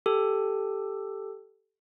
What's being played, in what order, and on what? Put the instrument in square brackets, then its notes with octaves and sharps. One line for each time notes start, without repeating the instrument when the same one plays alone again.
[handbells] G4 A4